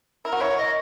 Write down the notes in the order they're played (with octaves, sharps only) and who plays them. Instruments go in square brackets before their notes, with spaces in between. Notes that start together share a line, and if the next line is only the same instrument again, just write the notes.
[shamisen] E4 [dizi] A#4
[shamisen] F#4
[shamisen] E4 [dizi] C#5
[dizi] D#5